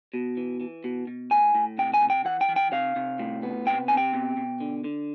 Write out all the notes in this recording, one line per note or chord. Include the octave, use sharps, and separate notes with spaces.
B2
E3
E3
B2
B2
A2 G#5
A2
C3 G5
G#5
C3
G5
E3 F#5
G5
E3
G5
C3 F5
C3
A2
B3
C3 G5
C4 G#5
G5
B2
B2
D3
D3